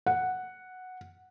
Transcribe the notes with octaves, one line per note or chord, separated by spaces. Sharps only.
F#5